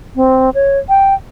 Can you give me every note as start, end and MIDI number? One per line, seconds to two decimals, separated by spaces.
0.16 0.50 60
0.54 0.78 73
0.89 1.14 79